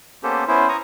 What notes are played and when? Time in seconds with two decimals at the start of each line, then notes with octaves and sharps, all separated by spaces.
0.23 A#3 B3 C#4 G4 A4 C5
0.48 B3 C#4 E4 C5
0.69 A#5 C#6 D#6